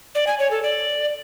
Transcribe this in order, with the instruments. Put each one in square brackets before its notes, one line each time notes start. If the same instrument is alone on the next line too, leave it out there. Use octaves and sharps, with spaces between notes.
[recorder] D5
G#5
C#5
A4
D5